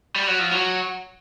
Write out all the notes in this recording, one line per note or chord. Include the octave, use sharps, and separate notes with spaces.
G3
F#3
F3
F#3